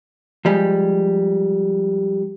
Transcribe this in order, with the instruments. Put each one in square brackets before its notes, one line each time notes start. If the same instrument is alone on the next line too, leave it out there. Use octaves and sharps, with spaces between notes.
[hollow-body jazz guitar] F3 G3 G#3